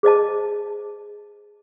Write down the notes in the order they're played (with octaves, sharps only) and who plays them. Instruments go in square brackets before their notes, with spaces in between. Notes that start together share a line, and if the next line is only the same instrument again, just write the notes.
[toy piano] G#4 C5 D#5 A5